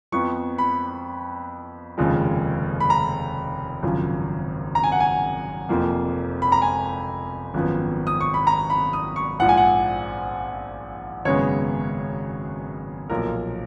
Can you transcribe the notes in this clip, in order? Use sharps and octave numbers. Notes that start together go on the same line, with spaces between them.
F2 F3 B3 C#6
B5
F1 D#2 C#3 F3 G#3
B5
A#5
G#1 F#2 C#3 F3
A#5
G#5
F#5
G#5
F1 F2 F3 A#3
B5
A#5
G#5
G#1 F#2 F3 B3
D#6
C#6
B5
A#5
B5
D#6
C#6
A#1 G#2 F3 F#5
G#5
F#5
G#1 F#2 C#3 G#3 B3 C#5
B1 A#2 F3 A#4